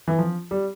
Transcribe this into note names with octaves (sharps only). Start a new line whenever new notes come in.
E3
F3
G3